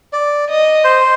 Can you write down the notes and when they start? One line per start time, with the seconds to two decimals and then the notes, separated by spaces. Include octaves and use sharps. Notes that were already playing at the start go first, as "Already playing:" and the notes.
0.13 D5
0.49 D#5
0.84 C5